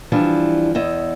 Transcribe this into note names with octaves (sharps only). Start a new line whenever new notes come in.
E3 F3 G3 D4
E2 D#5 E5